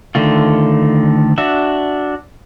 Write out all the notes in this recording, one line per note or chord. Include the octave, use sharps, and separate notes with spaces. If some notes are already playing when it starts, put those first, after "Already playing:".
D3 D#3 A3 F4
D4 F#4 E5